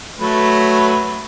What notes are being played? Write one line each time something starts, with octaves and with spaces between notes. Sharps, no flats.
F#3 A3 B4